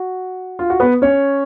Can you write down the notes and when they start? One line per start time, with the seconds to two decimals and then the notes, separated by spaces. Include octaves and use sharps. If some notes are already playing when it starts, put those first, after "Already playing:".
Already playing: F#4
0.59 F4
0.70 F#4
0.80 B3 B4
1.02 C#4 C#5